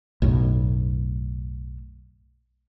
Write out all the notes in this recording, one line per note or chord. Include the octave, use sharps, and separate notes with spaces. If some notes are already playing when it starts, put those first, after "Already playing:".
B1 F#2 A2